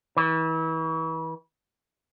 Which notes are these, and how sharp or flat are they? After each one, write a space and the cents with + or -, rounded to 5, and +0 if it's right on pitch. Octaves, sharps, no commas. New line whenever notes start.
E3 -35